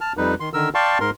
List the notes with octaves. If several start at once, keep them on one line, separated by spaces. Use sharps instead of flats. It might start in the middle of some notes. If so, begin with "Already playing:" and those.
A5 F6
F2 G3 D#4 B4
D#3 C6
D3 D#3 A#4 E6
D5 F5 G5 A5 C6 C#6
G#2 A#4 C6